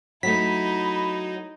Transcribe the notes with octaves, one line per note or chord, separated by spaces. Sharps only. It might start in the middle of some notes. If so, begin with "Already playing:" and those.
F#3 A3 D#4 E4 B5 B6